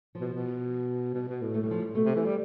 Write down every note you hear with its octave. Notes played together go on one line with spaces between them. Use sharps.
F3
B2
B2
B2 G3
B2
A2
A3
G3
F3
G3
B2 A3
C3
E3
G3